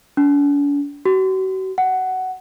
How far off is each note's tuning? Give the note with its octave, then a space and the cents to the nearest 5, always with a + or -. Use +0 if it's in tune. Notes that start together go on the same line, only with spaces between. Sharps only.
D4 -45
F#4 +40
F#5 +10